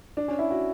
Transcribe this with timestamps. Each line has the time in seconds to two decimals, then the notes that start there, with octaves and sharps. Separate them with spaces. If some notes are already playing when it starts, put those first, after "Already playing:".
0.17 D4
0.28 C#4
0.39 E4
0.50 F#4